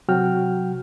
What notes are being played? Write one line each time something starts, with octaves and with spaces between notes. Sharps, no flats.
C3 F#3 F#4 G5 F6